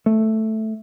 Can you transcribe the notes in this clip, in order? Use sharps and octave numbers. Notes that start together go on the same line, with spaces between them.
A3